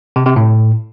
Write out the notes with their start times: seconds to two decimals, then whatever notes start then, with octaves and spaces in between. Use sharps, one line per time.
0.16 C3
0.26 C3
0.36 A2